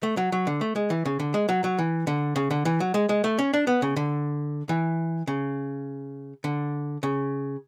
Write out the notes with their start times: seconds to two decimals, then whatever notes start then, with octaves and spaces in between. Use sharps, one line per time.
0.03 A3
0.17 F#3
0.32 F#3
0.47 D3
0.61 A3
0.76 G#3
0.90 E3
1.05 C#3
1.20 D3
1.34 G#3
1.49 F#3
1.64 F#3
1.79 E3
2.07 D3
2.36 C#3
2.51 D3
2.65 E3
2.80 F#3
2.94 G#3
3.09 G#3
3.24 A3
3.39 C#4
3.54 D4
3.67 B3
3.82 C#3
3.96 D3
4.69 E3
5.27 C#3
6.44 D3
7.03 C#3